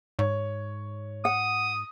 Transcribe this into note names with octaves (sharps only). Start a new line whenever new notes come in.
G#2 C#5
F#5 D#6